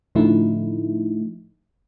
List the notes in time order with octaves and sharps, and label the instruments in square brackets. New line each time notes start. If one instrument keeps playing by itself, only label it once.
[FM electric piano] A2 D3 F3 A3 D#4 E4